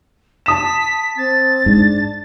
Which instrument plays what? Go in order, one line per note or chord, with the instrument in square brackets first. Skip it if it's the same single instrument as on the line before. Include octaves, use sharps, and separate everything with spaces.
[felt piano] A5 D#6 E7 [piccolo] B6
[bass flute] C4 [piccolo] A6
[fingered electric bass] G#2 [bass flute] D4